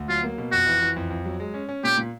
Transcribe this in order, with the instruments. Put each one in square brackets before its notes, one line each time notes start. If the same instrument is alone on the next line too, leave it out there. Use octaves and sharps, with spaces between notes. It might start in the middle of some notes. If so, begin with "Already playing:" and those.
Already playing: [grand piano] D2
[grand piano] F#3 [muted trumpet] F4
[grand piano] A#3
B2
[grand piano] F2 [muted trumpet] F#4
[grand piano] E3
E3
F2
F2
F#3
G#3
C#4
C#4
[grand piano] A#2 [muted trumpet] G4
[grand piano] A#2